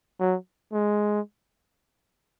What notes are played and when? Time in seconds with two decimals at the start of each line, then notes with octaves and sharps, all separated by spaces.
0.20 F#3
0.73 G#3